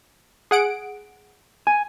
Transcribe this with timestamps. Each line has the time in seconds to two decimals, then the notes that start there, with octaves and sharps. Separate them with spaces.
0.51 G#4 F#5 D7
1.67 G#5